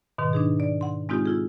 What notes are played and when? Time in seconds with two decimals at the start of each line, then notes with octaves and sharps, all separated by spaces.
0.18 G#2 B2 D#3
0.33 D4 D#4 G#4
0.60 D5
0.81 F#5 C6
1.09 G#3 C4 D#4 F4 G4
1.26 E4 F4 G#4